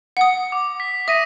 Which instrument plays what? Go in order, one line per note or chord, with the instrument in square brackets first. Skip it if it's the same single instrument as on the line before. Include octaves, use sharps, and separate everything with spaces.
[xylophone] F#5 D#6
[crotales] D6
B6
[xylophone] E5 [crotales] D#6 A#6 D#7